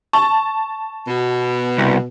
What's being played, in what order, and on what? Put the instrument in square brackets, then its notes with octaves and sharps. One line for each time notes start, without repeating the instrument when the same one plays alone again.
[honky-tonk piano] A5 [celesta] C#6
[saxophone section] B2
[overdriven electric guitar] C2